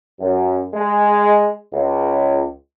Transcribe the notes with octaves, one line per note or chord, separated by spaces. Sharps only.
F#2
G#3
C#2